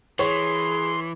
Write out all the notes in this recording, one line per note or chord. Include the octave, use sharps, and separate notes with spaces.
E3 G#4 C#5 C6